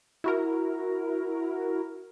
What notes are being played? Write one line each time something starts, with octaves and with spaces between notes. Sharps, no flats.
E4 F#4 A#4